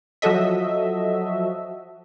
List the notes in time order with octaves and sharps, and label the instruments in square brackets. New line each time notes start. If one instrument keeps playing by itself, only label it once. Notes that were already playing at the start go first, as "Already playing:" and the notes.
[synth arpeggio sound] F3 F#3 F#4 A4 D#5 E5